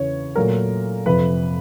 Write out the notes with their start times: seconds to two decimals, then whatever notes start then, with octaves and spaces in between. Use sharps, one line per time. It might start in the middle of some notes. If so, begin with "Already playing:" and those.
Already playing: E2 C#3 E3 C#5
0.35 A#2 F#3 A3 A#4
1.06 F2 C3 F3 B4